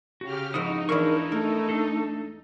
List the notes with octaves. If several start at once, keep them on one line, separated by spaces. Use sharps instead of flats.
C#3 F#4 G4 F6
F2 G#2 D#4 E4 F#4 D#6
E2 D4 E4 A#4 F5 C#6
A3 A#4
D4 A4